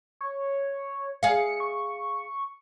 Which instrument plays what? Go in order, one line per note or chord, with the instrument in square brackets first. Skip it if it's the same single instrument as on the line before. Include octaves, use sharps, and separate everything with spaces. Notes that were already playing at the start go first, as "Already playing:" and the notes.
[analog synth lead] C#5
[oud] G#4 F5 [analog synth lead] C#7
[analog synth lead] C#6